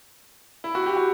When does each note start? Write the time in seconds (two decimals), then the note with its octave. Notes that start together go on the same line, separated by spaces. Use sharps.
0.64 E4
0.75 F#4
0.86 G4
0.96 F#4